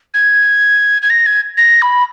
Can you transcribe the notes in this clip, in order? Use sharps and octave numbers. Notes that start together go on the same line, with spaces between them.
G#6
G#6
A#6
G#6
A#6
B5